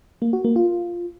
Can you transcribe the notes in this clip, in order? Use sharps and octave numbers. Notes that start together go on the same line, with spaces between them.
A#3
F#4
A#3
F4